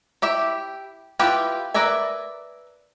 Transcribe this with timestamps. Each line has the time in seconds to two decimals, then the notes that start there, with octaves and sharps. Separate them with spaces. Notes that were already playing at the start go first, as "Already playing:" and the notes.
0.22 E4 G4 E5
1.19 E4 F4 G4 B4 G5
1.74 A#4 B4 D5 E5 G#5